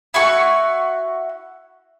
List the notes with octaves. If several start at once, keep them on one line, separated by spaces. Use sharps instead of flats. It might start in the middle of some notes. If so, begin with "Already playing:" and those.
E4 F#4 C#6